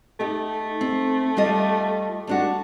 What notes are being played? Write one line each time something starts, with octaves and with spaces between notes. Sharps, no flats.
A3 D#4 G4
C4
G3 F4 D#5
G3 A3 D4 F#4